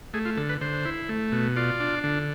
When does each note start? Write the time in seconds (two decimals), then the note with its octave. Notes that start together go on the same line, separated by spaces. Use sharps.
0.14 A3 G#4
0.25 F4
0.37 D3 A4
0.49 B4
0.61 D3 C5
0.85 E4
1.09 A3
1.32 B2
1.56 F4 D5
1.80 D4
2.04 D3